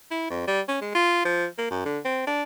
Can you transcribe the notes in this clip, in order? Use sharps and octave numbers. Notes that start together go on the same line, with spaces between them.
E4
F2
G3
C#4
G#3
F4
F3
A#3
F#2
D3
C4
D4